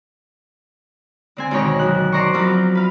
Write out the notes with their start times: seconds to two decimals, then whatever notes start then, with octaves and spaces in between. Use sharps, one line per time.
1.37 D3 C4 G#5
1.51 D2 G#2 B2 D#3 A#4 C#5
1.79 F#2 F#6
2.12 C5 D5 A#5 C6 C#6
2.33 F3 F#3 B3 C4 F4 F#4
2.75 B4 F5